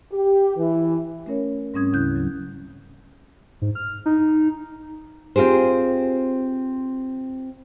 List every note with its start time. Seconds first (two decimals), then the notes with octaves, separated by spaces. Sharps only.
0.11 G4
0.56 E3
1.26 A3 C#4 A#4 C#5
1.74 G#2 G3 C4 C#4 D#6 G#6
1.93 D2 C#3 E4 F#6 G6
2.16 F#3
3.62 G#2
3.75 F6
4.06 D#4
5.36 C4 F4 G4 G#4 C5